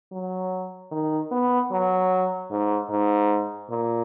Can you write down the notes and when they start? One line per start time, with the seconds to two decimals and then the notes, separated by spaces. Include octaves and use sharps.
0.11 F#3
0.91 D#3
1.31 B3
1.71 F#3
2.51 G#2
2.90 G#2
3.70 A#2